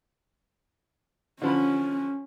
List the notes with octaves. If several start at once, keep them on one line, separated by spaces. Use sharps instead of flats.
D3 F3 C#4 B5